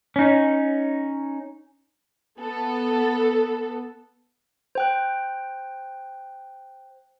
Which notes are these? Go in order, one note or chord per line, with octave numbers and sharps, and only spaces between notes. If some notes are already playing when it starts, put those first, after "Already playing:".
C#4 D#4
B3 A4
C5 G5 F#6